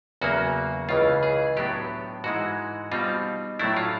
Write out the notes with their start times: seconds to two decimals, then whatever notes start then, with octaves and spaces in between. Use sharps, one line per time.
0.21 E2 C#3 F#3 A#3 F#4
0.89 C#2 C#3 E3 F4
1.23 G#4
1.57 A2 F#3 B3 D4 G4
2.24 G#2 E3 G#3 F#4
2.92 B2 G3 C4 D#4 F4
3.59 A2 F#3 A3 D4 E4
3.77 F4